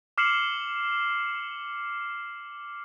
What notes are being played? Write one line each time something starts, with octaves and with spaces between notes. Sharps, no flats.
D6 F6 C7 C#7 E7 F#7